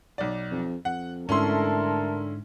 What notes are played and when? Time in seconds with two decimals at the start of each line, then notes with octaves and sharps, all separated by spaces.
0.18 B1 D5
0.51 F2
0.85 F2 F#5
1.29 G#2 D3 A3 C#4 E4 A4 A#4 C6